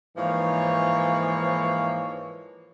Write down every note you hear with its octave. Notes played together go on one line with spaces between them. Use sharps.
G#2 E3 F3 A#3 C#5